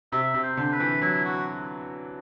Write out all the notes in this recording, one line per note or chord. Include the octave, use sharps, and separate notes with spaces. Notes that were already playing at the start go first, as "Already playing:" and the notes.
C3 E5
C3
C5
D3
B4
E3
F#3 E4
F#4